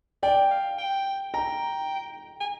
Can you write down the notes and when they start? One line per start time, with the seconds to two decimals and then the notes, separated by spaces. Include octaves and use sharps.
0.23 D5 G5
0.51 F5
0.79 G5
1.34 G5 A#5
2.40 G#5